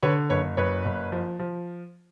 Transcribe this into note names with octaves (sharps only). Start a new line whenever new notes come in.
D3 B4 C#5
F#1 B4 C#5
F#1 B4 C#5
F#1
F3
F3